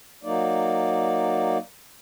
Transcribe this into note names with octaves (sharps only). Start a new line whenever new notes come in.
F#3 A#3 D#4 D5